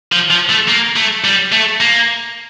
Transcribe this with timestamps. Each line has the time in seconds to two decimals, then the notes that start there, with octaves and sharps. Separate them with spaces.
0.12 F3
0.30 F3
0.49 A3
0.68 A#3
0.96 A3
1.24 G3
1.52 A3
1.80 A#3